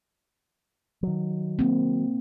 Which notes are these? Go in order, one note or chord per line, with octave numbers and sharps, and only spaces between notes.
D#3 F#3
A#3 C4